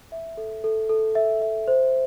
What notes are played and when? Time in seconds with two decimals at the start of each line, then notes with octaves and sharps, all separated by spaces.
0.12 E5
0.37 A4
0.64 A4
0.89 A4
1.15 E5
1.42 E5
1.68 C5